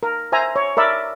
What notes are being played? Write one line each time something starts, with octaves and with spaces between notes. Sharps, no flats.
A#4
C5 E5 G#5 A#5
C#5
A#4 D5 E5 B5